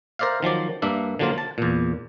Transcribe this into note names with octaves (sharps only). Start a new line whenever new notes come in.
A#4 C5 D5 E5 F5
D#3 F3 F#3 D5
G2 A#3 D4 E5
D3 F3 F#3 A#3 F4
A5
E2 A#2